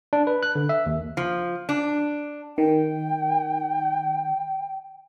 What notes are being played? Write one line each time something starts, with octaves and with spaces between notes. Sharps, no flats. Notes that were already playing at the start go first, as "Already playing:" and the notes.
D4
B4
F#6
D3
E5
D#2
F3
D4
D#3 G5